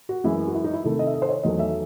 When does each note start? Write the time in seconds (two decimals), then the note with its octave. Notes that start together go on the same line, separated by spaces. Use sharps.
0.09 F#4
0.24 F#2 E3 G#3 E4
0.47 F#4
0.55 E4
0.64 D#4
0.73 E4
0.84 C3 D#3 A3 E4
0.99 D#5
1.07 E5
1.14 D#5
1.22 C5
1.29 C#5
1.43 E2 D#3 F#3 A3 D#5
1.59 E5